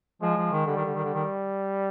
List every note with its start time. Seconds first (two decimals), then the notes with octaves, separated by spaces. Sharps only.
0.21 F3 G#3
0.37 F3
0.52 D#3
0.66 D3 G3
0.76 D#3
0.85 D3
0.95 D#3
1.04 D3
1.14 D#3